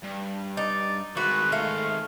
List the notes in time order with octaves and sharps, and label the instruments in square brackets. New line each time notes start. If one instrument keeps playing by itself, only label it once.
[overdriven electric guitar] G2
[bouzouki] D#4 [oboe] D5
[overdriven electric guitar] D#3 G#3 [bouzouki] F#4 [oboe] B4
[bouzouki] A3 [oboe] F5